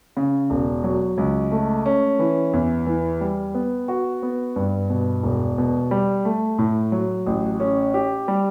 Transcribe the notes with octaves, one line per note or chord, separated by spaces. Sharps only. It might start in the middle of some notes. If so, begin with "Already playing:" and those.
C#3
E1
F#3
C#2
A3
C#4
E3
E2
E3
G3
B3
F#4
B3
G2
B2
E1
B2
G3
A3
A2
F#3
A1
C#4
G4
G3